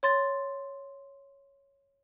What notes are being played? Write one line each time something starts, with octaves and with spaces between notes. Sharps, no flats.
C#5 C6 A6